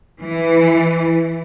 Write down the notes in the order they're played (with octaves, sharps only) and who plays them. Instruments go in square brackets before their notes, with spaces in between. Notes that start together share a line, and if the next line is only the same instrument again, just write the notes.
[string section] E3